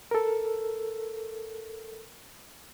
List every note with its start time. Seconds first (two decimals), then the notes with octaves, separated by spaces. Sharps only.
0.11 A4 A#4